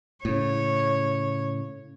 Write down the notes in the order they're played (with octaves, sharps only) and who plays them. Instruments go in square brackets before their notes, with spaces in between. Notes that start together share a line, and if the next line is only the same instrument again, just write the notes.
[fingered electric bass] A2 C#3 [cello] C#5